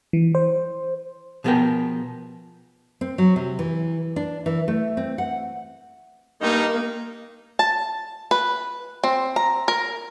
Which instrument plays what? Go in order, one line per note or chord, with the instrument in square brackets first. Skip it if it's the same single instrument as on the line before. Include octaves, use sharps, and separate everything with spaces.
[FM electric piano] E3
C5
[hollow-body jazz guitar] B2 F3 B3 G#4 A#4 G5
[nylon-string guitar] C4
F#3
C3
E3
D4
E3
A3
C4
F#5
[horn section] G2 D#4 [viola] A#3
[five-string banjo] A5
B4
C4
A#5
A#4